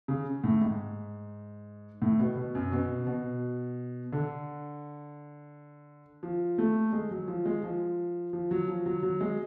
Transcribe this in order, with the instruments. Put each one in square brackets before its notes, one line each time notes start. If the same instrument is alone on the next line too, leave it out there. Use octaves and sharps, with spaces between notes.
[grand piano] C#3
A2
G#2
A2
B2
B2
F#2
B2
B2
D3
F3
A3
G#3
F#3
F3
G#3
F3
F3
F#3
F3
F#3
F#3
G#3